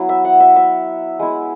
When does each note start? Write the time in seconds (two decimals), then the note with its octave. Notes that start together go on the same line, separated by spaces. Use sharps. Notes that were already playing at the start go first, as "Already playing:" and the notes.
Already playing: F#3 B3 E4
0.09 E5
0.25 F#5
0.40 E5
0.56 E5
1.19 G#3 B3 E4